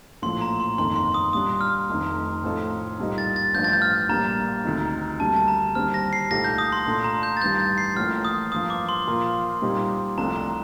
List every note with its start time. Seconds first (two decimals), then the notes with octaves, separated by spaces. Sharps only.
0.22 A#1 A2 F3 C6
0.41 A#5
0.60 C6
0.78 G1 F2 D#3 A#3 C6
0.96 C6
1.14 D#6
1.33 A#2 G3 D4 D#6
1.61 F6
1.89 F1 F2 D#3 A3
2.44 A2 F3 C4 D#4 A4
2.99 C2 A#2 G3 A#3 D#4
3.18 A6
3.36 A6
3.54 A1 G2 F3 G6
3.64 A6
3.73 G6
3.82 F6
4.09 A#1 A#2 G3 A#3 D4 A#5
4.65 D2 C3 D#3
5.20 D2 D3 G3 A#3 A5
5.36 A5
5.48 A#5
5.75 D#2 D3 G3 C4 F6
5.94 A#6
6.13 C7
6.31 C2 A#2 A3 D#4 G4 A#6
6.44 G6
6.58 D#6
6.72 C6
6.86 A#2 A3 D4 A4
7.04 A#5
7.23 G6
7.37 A6
7.41 A1 G2 D#3 G3 G6
7.60 A6
7.78 C7
7.96 A1 A2 F3 A#3 F4 F6
8.25 D#6
8.52 G2 F3 A#3 D#6
8.70 D6
8.89 C6
9.07 A#2 F3 A#3 F4 A#4
9.62 A#2 G3 C4 D#4 G4
10.18 C2 C3 F3 A3 D4 A#5
10.36 A#5